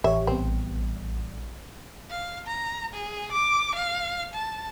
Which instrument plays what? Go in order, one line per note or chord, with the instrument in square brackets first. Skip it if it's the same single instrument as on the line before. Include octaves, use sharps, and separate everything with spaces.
[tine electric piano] A1 [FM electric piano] G4 C#5 [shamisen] E5
[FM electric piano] A#1 G3 B3 [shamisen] C4
[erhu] F5
A#5
G#4
D6
F5
A5